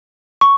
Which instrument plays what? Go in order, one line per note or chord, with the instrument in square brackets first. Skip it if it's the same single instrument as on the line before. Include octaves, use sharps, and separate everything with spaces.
[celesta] C#6